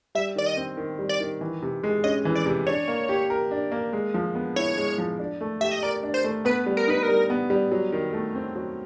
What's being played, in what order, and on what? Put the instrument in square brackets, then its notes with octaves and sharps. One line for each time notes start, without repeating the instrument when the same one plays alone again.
[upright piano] G3 [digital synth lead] E5
[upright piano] D#3 [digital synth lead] D5
[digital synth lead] D#5
[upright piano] C4
D#3
G3
[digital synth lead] D5
[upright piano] D#3
E3
C3
G#3
[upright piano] C#4 [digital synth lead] D#5
[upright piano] E3
[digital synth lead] D5
[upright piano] C3
[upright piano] D4 [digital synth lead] C#5
[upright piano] A#3
G4
A#4
D4
A#3
G#3
F3
B3
[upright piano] E4 [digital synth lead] C#5
[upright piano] G#3
F3
D4
A3
[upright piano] G4 [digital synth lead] E5
[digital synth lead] D#5
[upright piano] A#4 [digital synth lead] D5
[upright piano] D4
[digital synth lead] C5
[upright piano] A3
[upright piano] B3 [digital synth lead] B4
[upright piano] G3
[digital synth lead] A#4
[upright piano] D#4 [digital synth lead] B4
[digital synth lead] A#4
[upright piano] G3
B3
G3
F#3
D#3
A3
C4
F#3